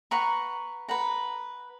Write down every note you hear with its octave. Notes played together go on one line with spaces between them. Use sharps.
B4 F#5 A#5 C#6
B4 F#5 A#5